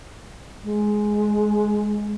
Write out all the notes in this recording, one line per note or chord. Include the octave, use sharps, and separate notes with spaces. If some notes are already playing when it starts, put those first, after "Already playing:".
G#3